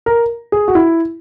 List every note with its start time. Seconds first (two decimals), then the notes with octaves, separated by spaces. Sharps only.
0.06 A#4
0.52 G#4
0.68 F#4
0.75 E4